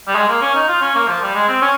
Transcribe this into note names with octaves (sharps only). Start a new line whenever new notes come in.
G3
G#3
A#3
C#4
D#4
F4
C#4
A#3
F3
G3
G#3
C4
C#4